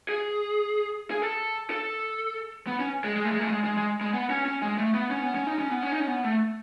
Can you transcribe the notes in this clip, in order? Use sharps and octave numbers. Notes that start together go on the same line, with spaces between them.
G#4
G#4
A4
A4
B3
C#4
G#3
G#3
A3
G#3
A3
G#3
G#3
G#3
G#3
B3
C#4
C#4
G#3
A3
B3
C#4
B3
C#4
D#4
C#4
B3
C#4
D#4
C#4
B3
A3